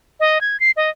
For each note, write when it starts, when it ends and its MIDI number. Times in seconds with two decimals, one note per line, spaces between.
0.20 0.41 75
0.41 0.59 92
0.60 0.71 96
0.77 0.90 75